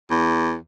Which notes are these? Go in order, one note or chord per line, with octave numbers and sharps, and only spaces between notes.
E2